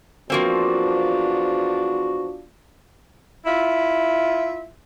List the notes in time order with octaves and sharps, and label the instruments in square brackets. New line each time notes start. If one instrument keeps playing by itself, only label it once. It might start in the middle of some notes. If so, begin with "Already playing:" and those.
[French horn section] E2 D4 F4 [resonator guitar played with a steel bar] F3 A#3 C4 [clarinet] F#4
[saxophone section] E4 F4 E5